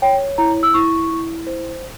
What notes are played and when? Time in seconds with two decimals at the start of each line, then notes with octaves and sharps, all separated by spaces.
0.02 C#5 G5
0.38 E4 A#5
0.63 E6
0.74 E4 C#6
1.11 E4
1.47 C5